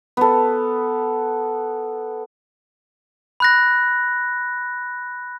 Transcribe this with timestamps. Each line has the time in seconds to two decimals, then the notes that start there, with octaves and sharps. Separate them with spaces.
0.17 B3 A4
3.40 B5 F#6 A#6